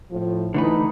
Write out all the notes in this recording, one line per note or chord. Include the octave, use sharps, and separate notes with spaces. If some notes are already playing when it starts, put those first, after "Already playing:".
A2 F3
D3 E3 A3 D#4 B4